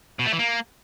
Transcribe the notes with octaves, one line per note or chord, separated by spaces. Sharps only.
B2
A3
E3
A#3